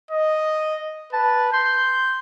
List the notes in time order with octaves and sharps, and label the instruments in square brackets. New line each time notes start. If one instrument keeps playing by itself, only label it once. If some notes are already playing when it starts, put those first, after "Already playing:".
[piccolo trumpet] D#5
[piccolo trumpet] B4 [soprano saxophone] A5
[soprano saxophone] C6 [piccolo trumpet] G6